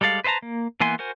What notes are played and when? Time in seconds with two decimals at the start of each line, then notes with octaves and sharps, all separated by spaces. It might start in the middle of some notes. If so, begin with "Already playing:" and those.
0.01 G3 G#3 A4 D5 F5
0.24 B4 C5 D#5 A5 A#5
0.42 A#3
0.80 E3 A#3 B3 G#5 C6
0.99 F#4 A#4 C5 G#5